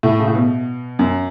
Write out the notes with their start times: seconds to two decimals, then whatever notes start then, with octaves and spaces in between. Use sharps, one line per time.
0.03 A2
0.19 C#3
0.28 A2
0.35 B2
0.99 F#2